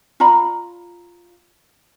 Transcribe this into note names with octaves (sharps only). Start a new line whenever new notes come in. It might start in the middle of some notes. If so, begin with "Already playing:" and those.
F4 D5 A#5 B5